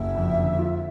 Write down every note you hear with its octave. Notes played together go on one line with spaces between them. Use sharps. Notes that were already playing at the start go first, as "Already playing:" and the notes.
Already playing: F#1 E5
F2
D3
F4